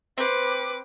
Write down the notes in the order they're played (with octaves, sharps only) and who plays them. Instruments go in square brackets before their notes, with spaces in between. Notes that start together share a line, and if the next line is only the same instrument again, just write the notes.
[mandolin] C4 [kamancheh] B4 D6